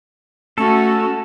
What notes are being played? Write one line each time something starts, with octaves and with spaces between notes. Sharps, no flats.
A3 C#4 F#4 A4